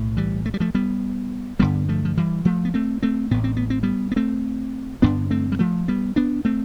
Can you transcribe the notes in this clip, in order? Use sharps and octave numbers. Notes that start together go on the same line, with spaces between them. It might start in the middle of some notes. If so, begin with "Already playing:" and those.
Already playing: B1 A2
E3 G3
A3
G3
F3 A3
G3 B3
A1 G2 D3 G3 B3
F3 A3
F3
E3 G3
F3 A3
B3
A3 C4
A3 C4
A1 A2 B3
C4
B3
C4
G3 B3
B3
A3 C4
A1 G2 D3 B3 D4
A3 C4
G3
F3 A3
G3 B3
B3 D4
A3 C4